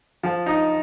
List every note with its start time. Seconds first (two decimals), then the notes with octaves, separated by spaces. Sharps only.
0.23 F3
0.46 D#4